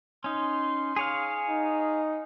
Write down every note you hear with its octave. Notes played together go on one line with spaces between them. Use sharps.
C#4 D#4 C6
G#4 C#5 F5
D#4